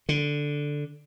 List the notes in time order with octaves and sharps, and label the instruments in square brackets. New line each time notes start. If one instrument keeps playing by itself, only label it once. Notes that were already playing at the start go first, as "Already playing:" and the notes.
[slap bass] D3